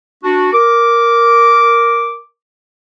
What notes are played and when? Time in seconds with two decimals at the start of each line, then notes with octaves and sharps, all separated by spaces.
0.23 D4 F#4
0.52 A#4 D6